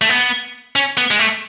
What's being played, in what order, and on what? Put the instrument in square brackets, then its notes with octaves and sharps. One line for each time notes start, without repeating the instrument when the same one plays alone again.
[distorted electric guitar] A3
B3
C#4
B3
G#3
A3